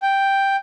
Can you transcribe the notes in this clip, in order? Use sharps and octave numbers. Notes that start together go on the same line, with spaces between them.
G5